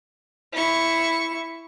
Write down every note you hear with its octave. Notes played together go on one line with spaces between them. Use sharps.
E4 C#6